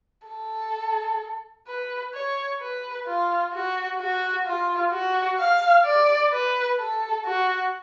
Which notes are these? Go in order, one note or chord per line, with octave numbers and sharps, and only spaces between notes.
A4
B4
C#5
B4
F4
F#4
F#4
F4
F#4
F5
D5
B4
A4
F#4